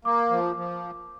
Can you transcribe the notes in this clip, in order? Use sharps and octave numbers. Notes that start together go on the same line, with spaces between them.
A#3 D6
F3
F3